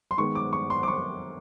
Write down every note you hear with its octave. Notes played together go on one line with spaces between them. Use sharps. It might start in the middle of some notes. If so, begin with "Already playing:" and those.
C6
D#3 G#3 B3 C#6
D6
C#6
C6
D6
C#6